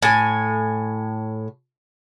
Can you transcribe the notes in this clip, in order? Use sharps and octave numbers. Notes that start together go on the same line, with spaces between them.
A2 G#5